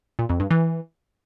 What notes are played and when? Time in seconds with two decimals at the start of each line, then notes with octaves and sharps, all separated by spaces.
0.19 A#2
0.29 F2
0.40 G2
0.51 E3